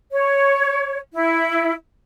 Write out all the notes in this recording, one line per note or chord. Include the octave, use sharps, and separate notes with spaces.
C#5
E4